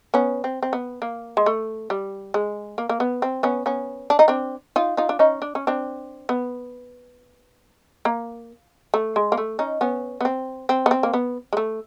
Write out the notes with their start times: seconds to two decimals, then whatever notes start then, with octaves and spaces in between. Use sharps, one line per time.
0.14 B3 C#4
0.44 C4
0.63 C4
0.73 B3
1.02 A#3
1.37 G#3
1.46 A3
1.90 G3
2.34 G#3
2.78 A#3
2.89 A#3
3.00 B3
3.22 C4
3.43 B3 C#4
3.66 B3 C#4
4.10 D4
4.19 D#4
4.28 C4 D4
4.76 D#4 F4
4.97 D#4 F4
5.09 D4
5.19 C#4 D#4
5.42 D4
5.55 C#4
5.67 C4 D4
6.29 B3
8.05 A#3
8.94 A3
9.16 G#3
9.32 A#3
9.38 A3
9.59 C#4 D#4
9.81 B3 C#4
10.21 B3
10.25 C4
10.69 C4
10.86 B3
10.91 C4
11.03 A#3
11.14 B3
11.53 G#3
11.57 A3